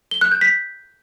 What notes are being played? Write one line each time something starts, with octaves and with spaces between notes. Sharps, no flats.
G7
F#6
G6
B6